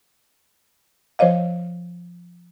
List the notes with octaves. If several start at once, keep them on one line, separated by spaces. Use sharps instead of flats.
F3 C5 C#5 D#5 F5